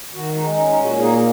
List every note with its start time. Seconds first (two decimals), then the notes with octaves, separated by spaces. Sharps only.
0.14 D#3 F#4
0.35 G#3 D#4
0.51 C#4 D#4
0.68 D#4
0.78 A#2 F#4
0.99 A#3 D#4 G#4